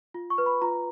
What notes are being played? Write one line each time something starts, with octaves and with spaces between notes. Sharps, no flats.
F4
C#6
B4
B5
F4 A#5